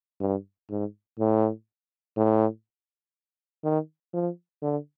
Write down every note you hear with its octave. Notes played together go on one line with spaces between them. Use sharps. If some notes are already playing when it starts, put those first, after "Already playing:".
G2
G#2
A2
A2
D#3
F3
D3